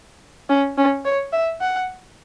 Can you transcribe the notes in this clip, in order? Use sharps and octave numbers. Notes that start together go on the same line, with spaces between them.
C#4
C#4
C#5
E5
F#5